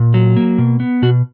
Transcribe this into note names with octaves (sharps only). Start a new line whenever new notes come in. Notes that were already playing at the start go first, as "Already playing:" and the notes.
Already playing: A#2
F#3
A#3
B2
B3
B2 F#4